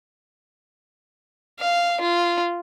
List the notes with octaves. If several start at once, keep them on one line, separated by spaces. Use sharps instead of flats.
F5
F4